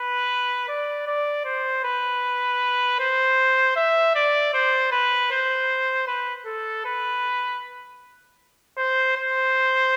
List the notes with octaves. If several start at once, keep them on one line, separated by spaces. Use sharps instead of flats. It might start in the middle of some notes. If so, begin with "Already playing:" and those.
Already playing: B4
D5
D5
C5
B4
C5
E5
D5
C5
B4
C5
B4
A4
B4
C5
C5